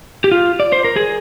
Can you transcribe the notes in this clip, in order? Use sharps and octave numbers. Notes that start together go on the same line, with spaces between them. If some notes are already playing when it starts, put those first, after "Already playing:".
G4
F4
D5
C5
A#4
G#4